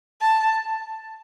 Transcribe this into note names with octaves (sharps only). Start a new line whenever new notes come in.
A5